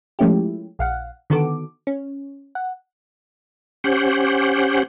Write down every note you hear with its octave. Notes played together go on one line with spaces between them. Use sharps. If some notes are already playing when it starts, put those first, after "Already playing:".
F3 G#3 A3 C#4 E4 G4
A#1 F5 F#5
D3 D#3 B3 F#4 A4 D6
C#4
F#5
C#4 G4 C5 F#5